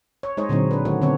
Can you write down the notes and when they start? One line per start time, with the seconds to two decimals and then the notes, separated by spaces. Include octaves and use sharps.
0.23 C#5
0.37 G#3 D#4 G#4 C5 C#5 D#5
0.49 A#2 D3 F#3 C4 D#4
0.71 D4 B4
0.85 D#3 A3 F#4 C#5
1.02 D3 D#3 B3 C4 A4 C#5